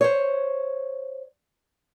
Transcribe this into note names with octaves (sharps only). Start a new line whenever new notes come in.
C5 C#5